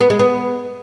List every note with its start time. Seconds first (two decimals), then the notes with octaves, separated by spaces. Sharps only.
0.01 B3
0.10 G#3
0.19 B3